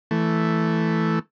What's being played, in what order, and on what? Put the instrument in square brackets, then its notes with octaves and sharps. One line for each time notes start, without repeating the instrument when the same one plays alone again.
[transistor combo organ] E3 A3